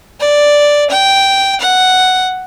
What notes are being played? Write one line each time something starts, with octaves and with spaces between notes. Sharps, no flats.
D5
G5
F#5